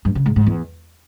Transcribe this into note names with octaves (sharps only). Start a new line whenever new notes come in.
G2
C#3
G#2
G#2
E2